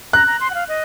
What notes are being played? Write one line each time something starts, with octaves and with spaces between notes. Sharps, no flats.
A#5 F#6
A#5
C6
F#5
F5
D#5